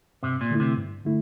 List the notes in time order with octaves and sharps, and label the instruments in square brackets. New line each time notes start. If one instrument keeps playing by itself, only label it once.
[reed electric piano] G2 [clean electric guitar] C3
[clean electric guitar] A#2
[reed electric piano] D3 A3 E4
[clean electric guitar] C3
[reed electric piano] G2
D3 A3 E4